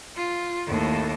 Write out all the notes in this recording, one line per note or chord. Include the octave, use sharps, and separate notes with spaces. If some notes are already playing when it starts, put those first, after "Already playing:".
F4
D#2 A2